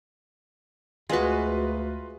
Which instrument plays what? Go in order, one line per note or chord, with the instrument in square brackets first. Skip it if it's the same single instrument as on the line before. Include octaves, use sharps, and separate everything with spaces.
[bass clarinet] D2 [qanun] G#3 F#4 [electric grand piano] F4 B4